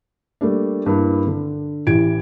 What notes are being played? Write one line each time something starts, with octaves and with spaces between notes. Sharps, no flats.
G3 A3 A#3 D4
G2 A#3 E4
D3
A1 E3 G4 G#6 D7